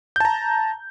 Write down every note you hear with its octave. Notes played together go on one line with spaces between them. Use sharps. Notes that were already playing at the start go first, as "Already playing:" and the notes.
A5 A#5 G6